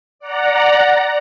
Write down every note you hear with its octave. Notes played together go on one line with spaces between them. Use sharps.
D5 F#5 A#5